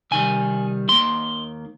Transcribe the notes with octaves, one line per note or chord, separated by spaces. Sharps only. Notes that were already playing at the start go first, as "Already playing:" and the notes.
C3 D#3 G3 G#5
D#2 D#3 A#3 C6